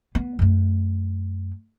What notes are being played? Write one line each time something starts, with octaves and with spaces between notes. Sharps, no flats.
B3
F#2 A3